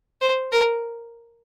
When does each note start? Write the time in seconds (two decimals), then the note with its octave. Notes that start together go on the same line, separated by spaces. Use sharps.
0.21 C5
0.52 A#4